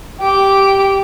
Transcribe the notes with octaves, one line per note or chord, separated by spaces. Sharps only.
G4 D6